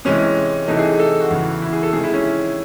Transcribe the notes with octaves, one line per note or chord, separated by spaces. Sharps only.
C3 E3 G#3 C#4
C3 E3 A3 D#4
G#4
A4
F#4
E2 C#3 E3
E4
G#4
A4
C3 D#3 G#3 G#4
E4
C#4